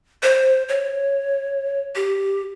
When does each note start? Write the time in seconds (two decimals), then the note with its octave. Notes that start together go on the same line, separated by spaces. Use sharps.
0.23 C5
0.69 C#5
1.95 G4